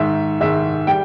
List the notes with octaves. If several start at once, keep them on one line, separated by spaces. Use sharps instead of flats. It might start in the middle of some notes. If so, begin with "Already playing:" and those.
Already playing: G#2 D#3 G#3 E5
G#2 D#3 G#3 E5
G3 G5